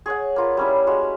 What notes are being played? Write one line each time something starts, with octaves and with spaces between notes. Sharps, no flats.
G#4 C#5 F#5
A#3 F4 B4
G3 C#4 E4
G#3 F#4